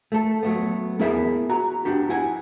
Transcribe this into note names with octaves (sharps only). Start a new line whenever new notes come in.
A3 A4
F#3 A3 B3
B3 E4 G#4 A#4 E5
F#4 A#5
B3 D4 F#4 G4
E4 F#5 G#5